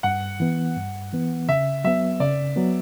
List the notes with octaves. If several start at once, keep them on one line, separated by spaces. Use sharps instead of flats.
G2 F#5
E3 B3
G2
E3 B3
C#3 E5
F#3 B3 E5
C#3 D5
F#3 B3